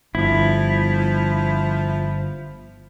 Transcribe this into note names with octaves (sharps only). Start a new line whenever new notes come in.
G1 F3 E4